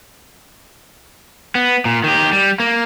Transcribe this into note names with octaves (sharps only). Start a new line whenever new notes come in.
B3
A#2
D#3 G4
G3
A#3